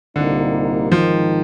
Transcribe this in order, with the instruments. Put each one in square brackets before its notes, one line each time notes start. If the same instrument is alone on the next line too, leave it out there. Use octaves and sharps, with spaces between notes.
[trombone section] C2 A#2 G3 A#3 D#4 [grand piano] D3
[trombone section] G#1 G#2 D#3 [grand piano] F3